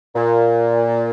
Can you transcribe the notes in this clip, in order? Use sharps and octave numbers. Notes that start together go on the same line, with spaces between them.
A#2